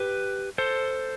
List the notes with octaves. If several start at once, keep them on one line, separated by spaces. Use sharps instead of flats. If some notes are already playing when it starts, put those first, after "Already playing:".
Already playing: G4 B4
A4 C5